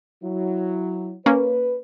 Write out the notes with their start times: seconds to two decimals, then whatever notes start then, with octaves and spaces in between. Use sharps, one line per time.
0.23 F#3 E4
1.26 A#3 C#4 B4